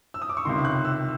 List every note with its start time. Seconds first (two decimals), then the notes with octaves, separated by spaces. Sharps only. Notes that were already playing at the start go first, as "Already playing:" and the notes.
0.14 E6
0.22 D#6
0.29 D6
0.37 C#6
0.45 C#2 C3 D#3 C6
0.65 F#6
0.85 E6